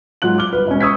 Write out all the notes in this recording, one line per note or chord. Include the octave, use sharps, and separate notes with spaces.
G#2 F#3 F4 F#6 F#7
D6 F6 G7
G1 B4
E1 C#4
C#6 D#6 E6 G#6 B6